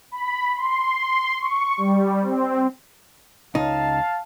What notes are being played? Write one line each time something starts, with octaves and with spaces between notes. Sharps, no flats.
B5
C6
C#6
G3
C4
C#2 D#4 F5 A5